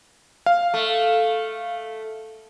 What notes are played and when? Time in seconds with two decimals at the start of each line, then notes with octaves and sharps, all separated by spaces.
0.46 F5
0.74 A3